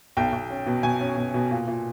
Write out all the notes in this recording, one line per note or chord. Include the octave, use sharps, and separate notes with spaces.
B1 G5
B1
C#4
B2
B2 G#5
C#4
B2
B2
A#2
A#2